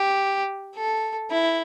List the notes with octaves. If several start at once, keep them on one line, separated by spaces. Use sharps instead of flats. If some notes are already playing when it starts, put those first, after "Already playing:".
Already playing: G4
A4
E4